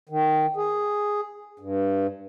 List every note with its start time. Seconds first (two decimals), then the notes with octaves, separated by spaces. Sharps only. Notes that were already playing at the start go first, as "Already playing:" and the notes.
0.09 D#3
0.56 G#4
1.59 G2